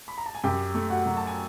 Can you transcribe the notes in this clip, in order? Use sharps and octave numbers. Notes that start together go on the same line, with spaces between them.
B5
A#5
A5
G#5
F#2 G4 G5
A3
F#4 F#5
F#3
A5
G#5